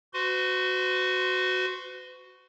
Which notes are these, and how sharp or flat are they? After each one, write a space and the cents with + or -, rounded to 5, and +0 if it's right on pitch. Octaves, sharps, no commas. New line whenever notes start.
F#4 +0 B4 +45 C6 +5